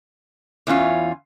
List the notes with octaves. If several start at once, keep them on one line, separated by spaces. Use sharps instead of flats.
E2 E3 C#4 F4